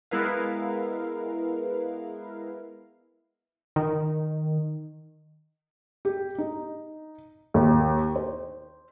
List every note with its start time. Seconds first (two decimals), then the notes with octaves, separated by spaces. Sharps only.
0.11 G#3 B3 E4 A#4 B4 F5
3.76 D#3
6.05 G4
6.38 D#4
7.54 D#2
8.16 C5